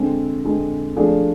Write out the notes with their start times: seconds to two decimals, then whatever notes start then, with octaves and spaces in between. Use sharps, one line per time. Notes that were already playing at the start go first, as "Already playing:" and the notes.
Already playing: D3 G#3 C4
0.44 D3 G#3 C4
0.96 F3 A3 D4 F4 G#4